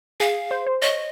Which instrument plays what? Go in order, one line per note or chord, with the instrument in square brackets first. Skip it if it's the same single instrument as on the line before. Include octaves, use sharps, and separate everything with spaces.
[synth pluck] G#4 [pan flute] F5
[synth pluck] C5
C5
[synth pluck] C#5 [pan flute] D#5